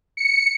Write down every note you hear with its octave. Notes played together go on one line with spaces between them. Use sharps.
C#7